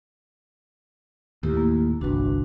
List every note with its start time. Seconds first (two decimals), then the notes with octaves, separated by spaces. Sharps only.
1.43 D#2 A2 E4 G4
1.57 A#3
2.01 G1 C2 D4 F#4 B4